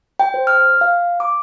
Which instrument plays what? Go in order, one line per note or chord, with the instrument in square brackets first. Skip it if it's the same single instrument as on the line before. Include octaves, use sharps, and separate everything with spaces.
[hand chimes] G5
C5
F6
F5
D6